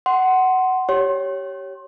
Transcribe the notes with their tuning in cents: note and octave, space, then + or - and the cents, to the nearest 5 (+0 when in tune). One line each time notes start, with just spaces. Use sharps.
F#5 +15 C6 +0
G4 -15 C#5 +0 C6 +25